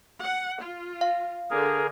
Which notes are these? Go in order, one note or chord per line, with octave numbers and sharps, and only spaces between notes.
F#5
F4
F5
D3 G#4 A#4